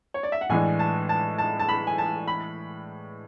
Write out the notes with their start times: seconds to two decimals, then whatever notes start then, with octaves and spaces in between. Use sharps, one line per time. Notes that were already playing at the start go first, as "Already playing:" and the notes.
0.14 C#5
0.23 D5
0.32 E5
0.41 F#5
0.49 A2 E3 G#3 D4 G#5
0.79 A5
1.09 A5
1.38 A5
1.59 A5
1.69 B5
1.87 G#5
1.98 A5
2.27 B5